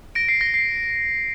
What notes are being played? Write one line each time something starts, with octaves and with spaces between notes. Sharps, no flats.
A#6 D7
C7
A#6
C7